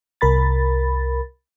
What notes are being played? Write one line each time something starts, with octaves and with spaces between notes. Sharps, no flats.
C2 A#4 B5 A6